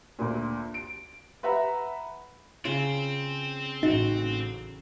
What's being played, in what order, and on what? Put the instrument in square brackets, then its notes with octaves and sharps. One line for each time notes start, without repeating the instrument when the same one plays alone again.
[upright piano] D2 A#2
D7
B4 E5 F#5 A#5 B5
[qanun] C#3 F4 [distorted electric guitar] C4
[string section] A1 [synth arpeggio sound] D#4 [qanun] F#4